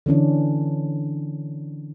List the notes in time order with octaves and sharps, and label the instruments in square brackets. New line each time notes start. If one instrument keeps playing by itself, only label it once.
[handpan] D3 E3 C#4 D4